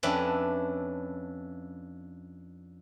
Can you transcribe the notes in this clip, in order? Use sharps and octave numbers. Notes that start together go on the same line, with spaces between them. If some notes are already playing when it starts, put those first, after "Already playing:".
F2 C#4 D4 B4 E5